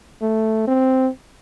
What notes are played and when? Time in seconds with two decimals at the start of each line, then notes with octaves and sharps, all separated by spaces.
0.22 A3
0.67 C4